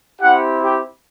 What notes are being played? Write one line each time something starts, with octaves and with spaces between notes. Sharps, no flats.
C4 E4 G4 F#5
G4